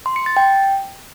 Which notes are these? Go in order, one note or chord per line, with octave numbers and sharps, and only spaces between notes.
C6
C#7
A6
G5